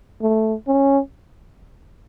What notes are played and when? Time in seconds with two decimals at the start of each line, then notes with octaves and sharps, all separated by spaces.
0.22 A3
0.67 C#4